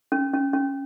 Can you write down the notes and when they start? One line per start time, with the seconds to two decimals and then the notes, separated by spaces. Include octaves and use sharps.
0.12 C#4
0.34 C#4
0.53 C#4